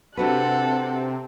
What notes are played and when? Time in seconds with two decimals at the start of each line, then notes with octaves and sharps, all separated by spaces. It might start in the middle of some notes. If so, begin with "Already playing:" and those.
0.17 C3 C4 D4 F#4 A4 B4 F#5